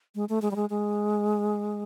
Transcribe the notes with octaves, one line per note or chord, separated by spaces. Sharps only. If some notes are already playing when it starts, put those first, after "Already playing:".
G#3
A3
G#3
G3
G#3
G#3